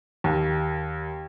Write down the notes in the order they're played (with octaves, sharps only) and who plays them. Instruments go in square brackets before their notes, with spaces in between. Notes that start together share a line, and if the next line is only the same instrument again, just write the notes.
[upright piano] D#2